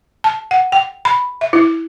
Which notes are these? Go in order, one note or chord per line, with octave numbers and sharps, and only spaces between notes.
A5
F#5
G5
B5
E5
E4